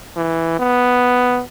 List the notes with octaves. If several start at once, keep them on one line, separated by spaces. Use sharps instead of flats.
E3
B3